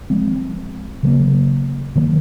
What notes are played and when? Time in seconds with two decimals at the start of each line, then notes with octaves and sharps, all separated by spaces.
0.10 F3 G#3 C4
1.03 C#3 F#3 A#3
1.96 D#3 F#3 A#3